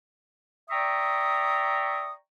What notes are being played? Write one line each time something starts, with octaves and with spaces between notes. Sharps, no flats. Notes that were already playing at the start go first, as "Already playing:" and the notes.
D5 E5 G5 A#5 C#6 D#6